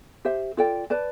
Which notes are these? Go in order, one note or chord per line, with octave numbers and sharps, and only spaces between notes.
G4 C5 E5
F4 A4 D5 G5
B4 D5 A5